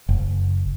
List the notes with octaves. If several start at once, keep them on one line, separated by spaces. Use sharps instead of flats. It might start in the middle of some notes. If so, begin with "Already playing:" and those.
F#1